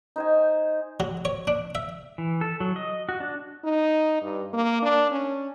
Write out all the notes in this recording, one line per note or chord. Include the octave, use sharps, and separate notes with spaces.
D#4 C5 G#5
F#3
C#5
D4
E5
E3
A4
F#3
D#5
F#4
D4
D#4
G2
A#3
D4
C#4